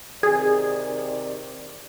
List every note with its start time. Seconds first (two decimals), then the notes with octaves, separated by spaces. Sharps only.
0.23 C3 D#3 G#4 D5